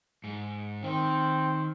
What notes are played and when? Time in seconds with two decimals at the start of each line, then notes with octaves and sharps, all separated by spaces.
0.24 G#2
0.83 D#3 C4